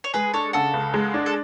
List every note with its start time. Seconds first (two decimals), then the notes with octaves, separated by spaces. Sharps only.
0.04 C#5
0.14 G#3 G#4 B4
0.34 D4 A4 C#5
0.53 C#3 F#4 A4
0.74 C#2
0.94 G#3
1.14 D4
1.26 A4